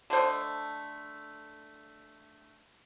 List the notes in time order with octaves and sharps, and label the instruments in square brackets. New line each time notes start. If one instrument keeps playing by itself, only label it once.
[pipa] D3 A3 C5 D#5